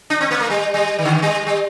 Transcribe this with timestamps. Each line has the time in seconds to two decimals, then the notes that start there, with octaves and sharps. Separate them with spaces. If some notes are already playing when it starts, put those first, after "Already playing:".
0.10 D4
0.21 C4
0.31 A#3
0.40 A3
0.50 G3
0.74 G3
0.98 D#3
1.05 D3
1.12 D#3
1.22 G3
1.47 G3